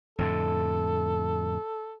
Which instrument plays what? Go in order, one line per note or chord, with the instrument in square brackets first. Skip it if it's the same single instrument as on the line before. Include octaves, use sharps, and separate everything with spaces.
[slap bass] F2 A2 D3 [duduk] A4